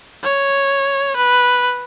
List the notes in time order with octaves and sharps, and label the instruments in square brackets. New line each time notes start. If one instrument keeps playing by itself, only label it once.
[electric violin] C#5
B4